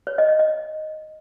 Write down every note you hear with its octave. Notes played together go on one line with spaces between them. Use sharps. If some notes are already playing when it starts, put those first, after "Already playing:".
C#5
D#5
D#5
D#5